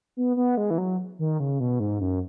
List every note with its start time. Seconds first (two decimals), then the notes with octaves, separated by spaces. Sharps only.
0.17 B3
0.37 B3
0.57 G#3
0.70 E3
0.78 F#3
1.19 D#3
1.40 C#3
1.60 B2
1.80 G#2
2.01 F#2